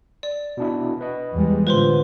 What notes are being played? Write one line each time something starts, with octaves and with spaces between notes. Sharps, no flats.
D5
B2 D4 E4
B4 D#5
E2 G3 G#3
A2 D3 F4 B4 C5 C6